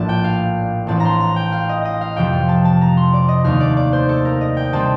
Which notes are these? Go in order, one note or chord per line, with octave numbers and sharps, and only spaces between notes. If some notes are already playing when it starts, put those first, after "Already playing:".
Already playing: A#1 A2 A3 D5 A5
G5
F5
A1 A2 A3 C4 A5
A#5
C6
A#5
G5
F5
D#5
D#5
F5
F2 C3 F3 C4 G5
F5
A5
A5
A#5
C6
D5
D#5
D#2 D#3 A3 F5
D5
D5
C5
A4
A#4
D#5
G5
C3 G3 C4 A5